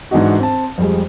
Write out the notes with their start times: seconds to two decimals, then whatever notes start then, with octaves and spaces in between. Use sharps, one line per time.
0.11 G#2 E3 D4 D#4 F#4
0.39 C4 A5
0.78 F2 G3 G#3